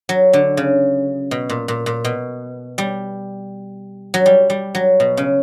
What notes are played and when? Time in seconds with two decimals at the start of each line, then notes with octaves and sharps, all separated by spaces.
0.09 F#3
0.33 D3
0.57 C#3
1.31 B2
1.49 A#2
1.68 A#2
1.86 A#2
2.04 B2
2.78 G3
4.14 F#3
4.26 G3
4.50 G3
4.75 F#3
5.00 B2
5.17 C#3